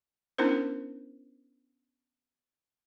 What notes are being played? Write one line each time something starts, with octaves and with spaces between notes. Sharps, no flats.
B3 C#4 D4 E4 A#4 C5